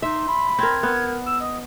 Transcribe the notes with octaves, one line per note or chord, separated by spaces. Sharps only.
D#4 E5 C6
B5
C4 A#4 G#6
B3 A#4
E6
D#5 D#6